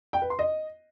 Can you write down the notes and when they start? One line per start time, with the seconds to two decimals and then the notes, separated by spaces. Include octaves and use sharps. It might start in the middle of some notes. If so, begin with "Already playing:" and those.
0.13 G5
0.22 B4
0.30 C6
0.39 D#5